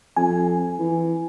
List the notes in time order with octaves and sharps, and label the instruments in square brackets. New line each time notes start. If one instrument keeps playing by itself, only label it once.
[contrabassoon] F2 [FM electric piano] G#5
[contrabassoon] E3